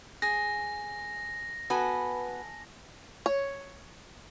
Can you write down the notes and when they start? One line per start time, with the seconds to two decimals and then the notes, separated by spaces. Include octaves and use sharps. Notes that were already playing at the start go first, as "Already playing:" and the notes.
0.22 G#4 A#6
1.70 B3 F#4 A4 B4 G#5
3.26 C#5